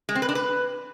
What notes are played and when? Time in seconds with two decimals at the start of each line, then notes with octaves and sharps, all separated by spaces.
0.09 G#3
0.15 C4
0.22 B4
0.29 D4
0.35 B4